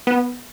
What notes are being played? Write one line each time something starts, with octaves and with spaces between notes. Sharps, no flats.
B3